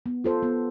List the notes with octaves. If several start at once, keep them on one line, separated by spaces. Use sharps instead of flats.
B3
F4 A4 C5
B3